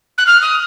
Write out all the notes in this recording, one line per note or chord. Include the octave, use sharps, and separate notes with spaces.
F#6
F6
D#6